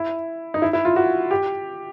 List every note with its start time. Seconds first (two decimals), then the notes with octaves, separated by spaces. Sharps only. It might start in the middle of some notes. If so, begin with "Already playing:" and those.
Already playing: E4
0.54 D#4
0.62 E4
0.73 E4
0.85 F4
0.96 F#4
1.31 G4